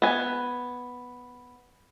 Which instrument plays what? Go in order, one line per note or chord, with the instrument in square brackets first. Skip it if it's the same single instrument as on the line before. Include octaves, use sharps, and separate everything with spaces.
[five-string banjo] B3 G#5